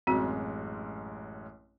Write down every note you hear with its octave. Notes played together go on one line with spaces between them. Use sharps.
A1 F#2 G#3 C4 F#4